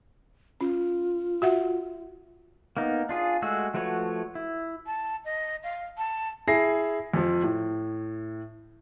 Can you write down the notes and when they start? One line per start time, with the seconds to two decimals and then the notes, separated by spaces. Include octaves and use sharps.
0.61 C#4 F4
1.42 F#4 E5 F#5
2.77 A#3 B3 D#4
3.09 D4 F4 G#4
3.42 G#3 A3 F#4 E6
3.74 F3 A3 F#4 B4 C#5
4.35 E4
4.86 A5
5.25 D#5
5.63 F5
5.98 A5
6.47 E4 G#4 A#6 C7
7.14 F2 F3
7.43 A2